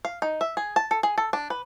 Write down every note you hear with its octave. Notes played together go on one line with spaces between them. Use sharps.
F5
D#4
E5
G#4
A5
A4
G#4
A4
D4
B4